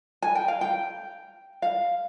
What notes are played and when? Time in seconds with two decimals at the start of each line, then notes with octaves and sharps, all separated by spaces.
0.22 G#5
0.35 G5
0.48 F5
0.61 G5
1.62 F5